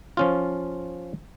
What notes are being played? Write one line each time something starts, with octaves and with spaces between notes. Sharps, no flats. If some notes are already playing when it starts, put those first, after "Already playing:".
F3 C#4 F4